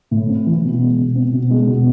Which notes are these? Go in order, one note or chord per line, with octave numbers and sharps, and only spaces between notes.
A2
C4
E3
B2
G#3
B2
C4
B2
G#3
B2